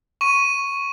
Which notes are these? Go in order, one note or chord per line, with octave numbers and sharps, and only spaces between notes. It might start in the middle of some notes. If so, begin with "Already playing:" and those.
C#6 D#7